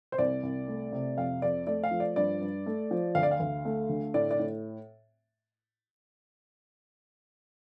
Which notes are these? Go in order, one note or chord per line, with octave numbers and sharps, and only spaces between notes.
C5
C2 D5
C2
A3
C3
F2 F5
F2 D5
A3 D5
F5
F3
D5
G2 D5
G2
A3
F3
D2 F5
D5
F5
D2
A3
D3
A2 D5
D5
A2